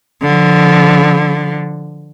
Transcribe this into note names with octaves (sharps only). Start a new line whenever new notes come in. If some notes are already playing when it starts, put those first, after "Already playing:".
D3 F3